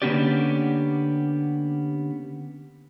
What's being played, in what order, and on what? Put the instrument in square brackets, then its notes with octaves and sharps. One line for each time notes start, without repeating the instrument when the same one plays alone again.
[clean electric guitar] D3 A#3 B3 C#4 G4 D5